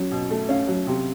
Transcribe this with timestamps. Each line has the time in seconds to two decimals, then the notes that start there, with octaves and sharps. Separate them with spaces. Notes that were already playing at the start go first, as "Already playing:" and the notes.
Already playing: F#3 C#4
0.12 B2
0.30 A3
0.49 C#4 F5
0.67 F#3
0.87 C3